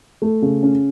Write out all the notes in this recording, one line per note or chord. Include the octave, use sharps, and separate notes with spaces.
A3
C#3
C#4